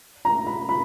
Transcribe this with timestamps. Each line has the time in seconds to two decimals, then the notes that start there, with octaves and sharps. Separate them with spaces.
0.25 A#5
0.47 B5
0.69 B5